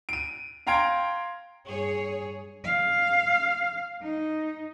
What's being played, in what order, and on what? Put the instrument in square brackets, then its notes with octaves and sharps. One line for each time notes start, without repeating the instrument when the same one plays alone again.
[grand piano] D7 D#7
F5 G5 A#5 C6 G#6 D7
[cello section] G2 G#4 C#5
[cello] F5
D#4